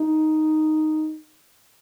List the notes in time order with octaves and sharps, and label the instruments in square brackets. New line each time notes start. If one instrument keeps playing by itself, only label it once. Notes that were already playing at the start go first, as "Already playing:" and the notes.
Already playing: [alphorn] D#4